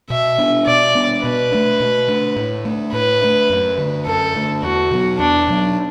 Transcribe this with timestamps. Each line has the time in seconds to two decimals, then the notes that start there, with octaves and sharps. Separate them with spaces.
0.10 B2 E5
0.38 B3 D4
0.67 B2 D5
0.95 B3 D4
1.23 B2 B4
1.52 A3 D4
1.80 B2
2.08 A3 D4
2.36 A2
2.65 A3 D4
2.93 A2 B4
3.22 A3 D4
3.50 F#2
3.78 D3 A3
4.06 F#2 A4
4.34 D3 A3
4.62 E2 F#4
4.91 B2 F#3 B3
5.19 E2 D4
5.48 B2 F#3 B3